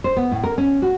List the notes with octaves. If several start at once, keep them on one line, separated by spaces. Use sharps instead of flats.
C5
B3
A2
A#4
C#4
F#4